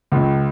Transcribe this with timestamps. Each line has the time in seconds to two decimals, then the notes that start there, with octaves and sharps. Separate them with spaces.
0.12 C#2